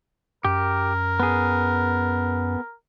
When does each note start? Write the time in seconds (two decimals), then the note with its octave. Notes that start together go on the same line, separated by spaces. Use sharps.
0.45 F#2 G4 A#4
1.20 B3 G#4